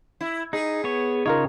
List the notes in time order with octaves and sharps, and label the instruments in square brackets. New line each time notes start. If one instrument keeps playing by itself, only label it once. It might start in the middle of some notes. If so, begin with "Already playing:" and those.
[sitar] E4
[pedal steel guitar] D#4 [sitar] G#4
[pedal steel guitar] B3 C#5
[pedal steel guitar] C#3 C#5 [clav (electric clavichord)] D#4 F4 A#4